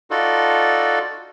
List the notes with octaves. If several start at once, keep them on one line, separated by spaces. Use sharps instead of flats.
D#4 F4 F#4 A4 D5